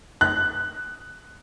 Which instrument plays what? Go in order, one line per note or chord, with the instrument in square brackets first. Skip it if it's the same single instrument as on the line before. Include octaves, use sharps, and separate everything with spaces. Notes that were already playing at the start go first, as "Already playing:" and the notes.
[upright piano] F#6